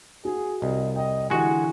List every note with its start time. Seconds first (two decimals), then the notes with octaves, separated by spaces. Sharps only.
0.25 F#4 G#4
0.62 C2 D#5
0.96 D#5 G5
1.30 D3 E3 G#3 F#4 G4 G#5